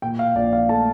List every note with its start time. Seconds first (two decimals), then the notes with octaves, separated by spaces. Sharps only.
0.02 A#2 G5
0.19 F5
0.35 A#1 D5
0.53 F5
0.69 A3 A5